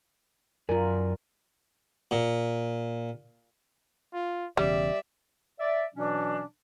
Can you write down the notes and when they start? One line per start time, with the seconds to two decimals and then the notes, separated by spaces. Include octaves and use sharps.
0.69 F#2 F4 A#4 D5 G#5
2.11 A#2
4.13 F4
4.57 E1 E2 C#3 G3 D5 E5
5.59 D5 E5
5.95 B2 E3 F#3 C#4 D4